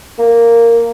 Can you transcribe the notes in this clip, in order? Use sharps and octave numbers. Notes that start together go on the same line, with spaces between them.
A#3